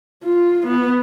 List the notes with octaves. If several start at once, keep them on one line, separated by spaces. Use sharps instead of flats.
F4
B3